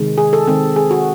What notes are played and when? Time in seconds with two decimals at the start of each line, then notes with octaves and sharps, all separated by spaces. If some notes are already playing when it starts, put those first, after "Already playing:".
Already playing: C3 D#3 G#3
0.18 G#4
0.33 A4
0.48 D#3 G#3 C4 A4
0.76 G#4
0.91 F#4